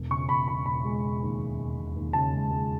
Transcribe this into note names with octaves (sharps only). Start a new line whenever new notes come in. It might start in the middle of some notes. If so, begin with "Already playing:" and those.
Already playing: E1
C#3 C#6
E1 B5
E1 B5
E1 B5
G#3
E1
D#2
E1
E1
E1
D#2
C#3 A5
G#3
G#3